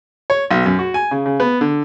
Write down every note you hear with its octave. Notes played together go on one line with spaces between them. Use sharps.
C#5
B1
F#2
F#4
G#5
C#3
C#3
B3
D3